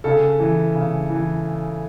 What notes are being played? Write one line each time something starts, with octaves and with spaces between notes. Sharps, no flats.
C#3 A4
E3
C#3
E3